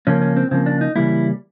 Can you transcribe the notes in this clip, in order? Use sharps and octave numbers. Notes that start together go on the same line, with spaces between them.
C#3 F3 A#3 C#4
C#4
C4
C#3 F3 A#3 C4
D4
D#4
C#3 E3 G3 A#3 E4